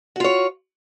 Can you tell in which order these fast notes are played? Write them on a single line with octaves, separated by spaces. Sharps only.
F#4 F4 C#5